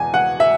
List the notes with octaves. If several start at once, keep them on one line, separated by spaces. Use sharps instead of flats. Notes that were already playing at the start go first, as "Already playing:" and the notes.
Already playing: E2 B2 G#5
F#5
E5